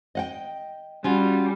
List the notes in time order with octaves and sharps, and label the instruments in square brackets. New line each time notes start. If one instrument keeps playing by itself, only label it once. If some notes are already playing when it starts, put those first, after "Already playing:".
[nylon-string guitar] D#5 F#5 G5
[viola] G3 [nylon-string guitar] C#4 F4 F#4